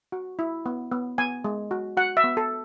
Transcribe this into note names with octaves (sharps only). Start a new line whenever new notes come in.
F#4
E4
B3
B3
B3 G#5
G#3
F#4
F#4 F#5
E5
B3
A4